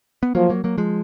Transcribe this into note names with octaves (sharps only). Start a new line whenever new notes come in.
B3
F3 F#3 A#3
F#3 A#3
F#3 A#3
F3 G#3